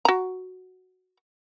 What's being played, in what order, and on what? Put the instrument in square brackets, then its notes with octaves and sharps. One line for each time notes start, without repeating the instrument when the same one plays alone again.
[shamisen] F#4 A#5